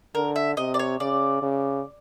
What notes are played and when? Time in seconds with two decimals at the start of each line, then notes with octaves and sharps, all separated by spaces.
0.15 D3 A#4
0.36 E5
0.57 C3 D#5
0.74 D5
0.79 C#5
1.00 C#3 D5
1.42 C#3